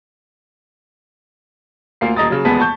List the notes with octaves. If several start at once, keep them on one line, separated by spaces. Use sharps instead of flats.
D2 A#3 F4 C7
D#1 D#5 A#5 D#6 A6
C#3 F#3
D#1 E2 G#3 B3 A5 B6
A5 C#6 G6